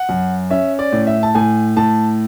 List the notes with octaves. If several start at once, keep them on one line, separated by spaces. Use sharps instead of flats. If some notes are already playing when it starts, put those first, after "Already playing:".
Already playing: F#5
F#2
C#4 E5
D5
A2
E5
A5
A2 G#5
A2 A5